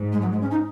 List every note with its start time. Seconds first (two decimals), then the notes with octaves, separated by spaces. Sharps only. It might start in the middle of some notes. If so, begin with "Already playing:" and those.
Already playing: G#2
0.12 G#3
0.22 F#3
0.32 G#3
0.42 C#4
0.51 D#4